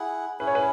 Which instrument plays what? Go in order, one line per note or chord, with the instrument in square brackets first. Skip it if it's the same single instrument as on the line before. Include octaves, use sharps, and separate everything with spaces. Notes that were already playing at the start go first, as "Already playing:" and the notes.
Already playing: [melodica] E4 G#4 F#5
[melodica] C#4 E4 G#4 [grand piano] B4
[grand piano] C#5
B4